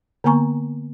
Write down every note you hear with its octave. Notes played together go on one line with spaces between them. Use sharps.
D3 A#3 B3 G#5 A#5 C#6